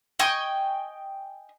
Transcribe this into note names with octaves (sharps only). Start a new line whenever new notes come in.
D#5 G5 G#5 C#6